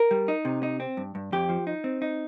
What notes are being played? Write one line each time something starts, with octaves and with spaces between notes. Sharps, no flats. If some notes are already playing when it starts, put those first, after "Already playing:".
Already playing: A#4
G3
D#4
C3
D#4
C4
G2
G2
F2 G4
F3
D#4
C4
D#4